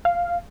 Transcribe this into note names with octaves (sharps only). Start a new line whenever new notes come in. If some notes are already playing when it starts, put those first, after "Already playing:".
F5